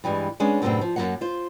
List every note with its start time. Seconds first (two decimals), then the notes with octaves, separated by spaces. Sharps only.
0.04 G2 E3 G3 G#3
0.40 G#3 B3 C#4 D4 G#4
0.62 F#2 A2 C3 B3 C4 D4
0.81 F3
0.96 F#2 E3 F#3 A#3 F#5
1.21 F4 C5